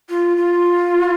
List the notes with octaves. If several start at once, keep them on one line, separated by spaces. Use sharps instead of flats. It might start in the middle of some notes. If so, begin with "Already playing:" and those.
F4
F4